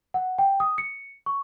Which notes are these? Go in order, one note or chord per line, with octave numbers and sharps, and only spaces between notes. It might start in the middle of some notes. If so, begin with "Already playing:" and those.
F#5
G5
D#6
C#7
C#6